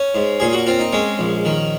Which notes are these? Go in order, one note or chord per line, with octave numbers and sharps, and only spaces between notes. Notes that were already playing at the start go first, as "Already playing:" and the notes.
Already playing: C#4
G#2
A#2 G#4
F#4
C4 F4
D#4
G#3 C#4
A#1
D#3